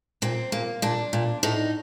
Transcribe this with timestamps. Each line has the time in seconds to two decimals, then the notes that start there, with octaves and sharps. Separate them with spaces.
0.22 A#2 C4
0.52 A#2 A#3
0.82 A#2 D4
1.13 A#2
1.43 A2 D#4